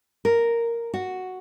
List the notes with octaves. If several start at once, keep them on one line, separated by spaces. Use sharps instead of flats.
A#4
F#4